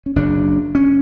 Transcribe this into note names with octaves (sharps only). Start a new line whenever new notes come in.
C#4
F#1 F#2 C#3 D4
C#4